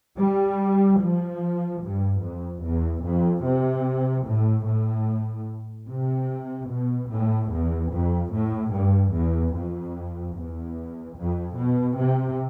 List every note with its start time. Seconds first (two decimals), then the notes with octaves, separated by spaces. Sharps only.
0.18 G3
1.00 F3
1.82 G2
2.22 F2
2.63 E2
3.04 F2
3.44 C3
4.25 A2
4.66 A2
5.89 C3
6.69 B2
7.11 A2
7.51 E2
7.92 F2
8.33 A2
8.74 G2
9.13 E2
9.54 F2
10.35 E2
11.17 F2
11.58 B2
11.98 C3